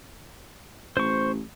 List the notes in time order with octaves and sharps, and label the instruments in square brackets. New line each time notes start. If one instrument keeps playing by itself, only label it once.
[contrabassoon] A1 [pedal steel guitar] C5 C#6